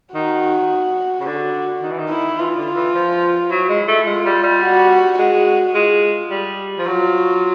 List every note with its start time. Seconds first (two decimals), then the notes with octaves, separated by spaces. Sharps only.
0.14 D#3 F#4
1.20 C#3
1.26 D3 F#4
1.82 D#3
1.91 E3
1.99 D#3
2.10 E4
2.38 E3 F4
2.57 D3
2.67 F4
2.76 E3
2.94 F3
3.51 F#3 E4
3.69 G#3
3.88 A3
4.06 G#3 F4
4.25 G3
4.43 G3
4.62 F#4
5.19 G#3 F#4
5.74 G#3 F4
6.31 G3
6.79 F3
6.87 F#3 F4